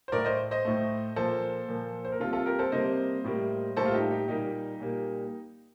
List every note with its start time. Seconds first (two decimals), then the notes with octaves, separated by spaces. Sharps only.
0.08 C5
0.12 A2 A3 A#4 D5
0.25 C5 D#5
0.51 C5 D#5
0.65 A2 A3
1.16 A#2 F3 A#3 A4 C5
1.68 A#2 F3 A#3
2.05 C5
2.12 A#4
2.20 C3 G3 A#3 F4 A4
2.33 F4 A4
2.46 G4 A#4
2.59 A4 C5
2.72 C3 G3 A#3 C5 D#5
3.24 A2 G3 A#3
3.77 A2 G3 A#3 A4 C5
3.86 F4
3.94 D#4 G4
4.11 D#4 G4
4.28 A#2 G3 A#3 D#4 G4
4.80 A#2 G3 A#3